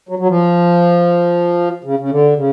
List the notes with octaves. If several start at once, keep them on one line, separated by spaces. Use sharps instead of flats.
F#3
F#3
F3
C#3
C#3
D3
C#3